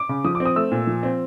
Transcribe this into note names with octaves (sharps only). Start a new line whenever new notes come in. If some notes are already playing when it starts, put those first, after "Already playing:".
Already playing: D6
C#3
F3 D#6
D6
C4
D#6
A3 E6
A#2
F3
C4